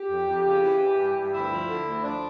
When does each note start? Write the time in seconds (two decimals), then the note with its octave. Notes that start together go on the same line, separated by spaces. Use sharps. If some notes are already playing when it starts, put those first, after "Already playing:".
Already playing: G4
0.10 F2
0.27 F2
0.46 C#3
0.63 E3
0.81 E3
0.98 G2
1.17 G2
1.34 D2 E4
1.52 F3
1.69 D3
1.87 D2
2.04 F3 D4